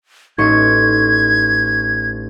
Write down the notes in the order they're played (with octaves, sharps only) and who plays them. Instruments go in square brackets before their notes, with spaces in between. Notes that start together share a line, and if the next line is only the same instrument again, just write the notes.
[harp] A1 D#4 C#6 [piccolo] G#6